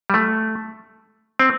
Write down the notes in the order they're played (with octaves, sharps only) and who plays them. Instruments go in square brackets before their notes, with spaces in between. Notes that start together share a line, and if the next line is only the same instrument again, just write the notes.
[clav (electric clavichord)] G3
A3
C4